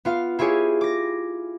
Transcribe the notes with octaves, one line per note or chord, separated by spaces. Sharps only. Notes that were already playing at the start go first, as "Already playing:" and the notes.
B3 F4 F5
E4 F4 G4 G#4 C#5
D6 A#6